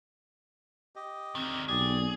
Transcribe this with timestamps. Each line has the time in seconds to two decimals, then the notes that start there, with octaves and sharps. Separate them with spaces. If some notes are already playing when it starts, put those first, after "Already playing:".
0.96 G4 D#5
1.35 D3 D#3 C4
1.68 B1 G4 G#4 D5